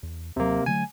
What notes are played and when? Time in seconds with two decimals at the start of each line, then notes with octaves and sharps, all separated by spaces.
0.03 E2
0.36 D#2 C3 F#3 A#3
0.66 D3 F#3 A3 G#5